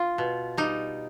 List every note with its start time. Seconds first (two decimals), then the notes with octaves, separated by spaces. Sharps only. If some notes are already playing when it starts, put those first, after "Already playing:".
Already playing: F4
0.18 B2
0.57 G3 D#4